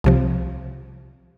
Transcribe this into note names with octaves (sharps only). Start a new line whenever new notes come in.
C2 C3 F3